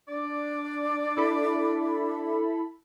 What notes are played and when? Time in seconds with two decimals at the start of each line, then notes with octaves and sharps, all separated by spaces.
0.08 D4 D5
1.17 E4 A4 B5